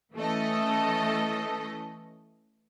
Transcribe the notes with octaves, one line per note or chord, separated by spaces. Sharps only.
E3 A3 C#4 A4 D#5